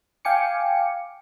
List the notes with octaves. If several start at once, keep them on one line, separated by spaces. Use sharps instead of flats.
F5 G5 G#5 D6 C#7